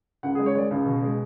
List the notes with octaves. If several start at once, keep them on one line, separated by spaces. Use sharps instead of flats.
C#2 F#5
G#4
G#3
C#5
G#3 D5
C#2
B2
G#3